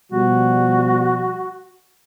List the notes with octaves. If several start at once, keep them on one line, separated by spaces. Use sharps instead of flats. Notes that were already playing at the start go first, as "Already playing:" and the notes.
B2 F3 G3 F#4